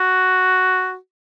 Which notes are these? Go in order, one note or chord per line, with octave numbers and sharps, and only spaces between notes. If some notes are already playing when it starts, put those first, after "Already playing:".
Already playing: F#4